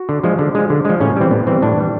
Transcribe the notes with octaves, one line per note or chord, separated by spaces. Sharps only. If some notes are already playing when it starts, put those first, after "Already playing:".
Already playing: F#4
D3
F3 G#3
D3
F3 G#3
D3
F3 G#3
A2 C#4
E3 G3 C4
A2 B3
E3 G3 C4
A2 D4
E3 G3